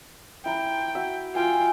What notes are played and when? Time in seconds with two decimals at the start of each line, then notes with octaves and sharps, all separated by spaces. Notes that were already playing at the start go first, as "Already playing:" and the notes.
0.45 E4 G5 A#5 C6
0.95 F#4 E5
1.35 F4 G5 G#5